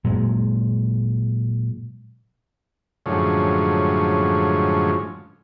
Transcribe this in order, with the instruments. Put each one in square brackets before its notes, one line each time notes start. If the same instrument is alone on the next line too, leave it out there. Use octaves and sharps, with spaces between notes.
[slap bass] A#2 F#3 G#3
[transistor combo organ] F#2 A2 D3 F3 G#3 C#4